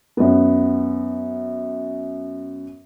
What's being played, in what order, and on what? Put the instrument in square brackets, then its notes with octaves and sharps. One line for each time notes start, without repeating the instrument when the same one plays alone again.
[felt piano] F#2 B3